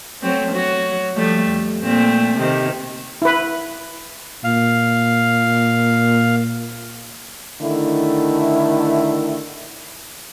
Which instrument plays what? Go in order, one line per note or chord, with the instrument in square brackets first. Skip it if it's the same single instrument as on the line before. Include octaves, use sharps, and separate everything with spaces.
[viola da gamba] F#3 A3 C4
F#3 F#4
F3 G3 A3
F2
A#2 A3 C4
C3 D#3
[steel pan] E4 B4
[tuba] A#2 [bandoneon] F5
[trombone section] D3 D#3 A3 E4